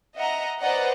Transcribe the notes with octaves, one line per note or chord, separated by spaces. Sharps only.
D#5 E5 F#5 A#5
B4 C5 D5 D#5 F#5 A#5